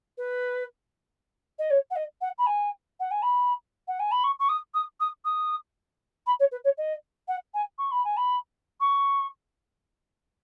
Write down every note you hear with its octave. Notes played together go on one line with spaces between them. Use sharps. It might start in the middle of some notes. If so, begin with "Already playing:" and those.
B4
D#5
C#5
F#5
D#5
F#5
B5
G#5
F#5
G#5
B5
F#5
G#5
B5
C#6
C#6
D#6
D#6
D#6
D#6
B5
C#5
B4
C#5
D#5
F#5
G#5
C#6
B5
G#5
B5
C#6